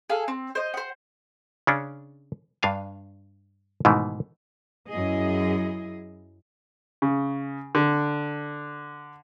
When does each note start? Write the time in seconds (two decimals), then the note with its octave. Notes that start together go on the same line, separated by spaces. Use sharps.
0.09 G#4 A4 F5
0.28 C4
0.55 C5 D#5
0.74 C5 F#5
1.67 C#3 C#4 D4
2.63 G2 D4 F5 G#5
3.85 G#2 B2 D#3 E3 A3
4.89 F#2 E4 G#4 D#5
7.02 C#3
7.75 D3